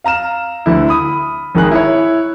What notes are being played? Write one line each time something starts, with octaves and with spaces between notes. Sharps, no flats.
F5 A#5 F6 E7
D2 D3 E4
B5 D#6
G#1 D#3 G#4 F#6
E4 C#5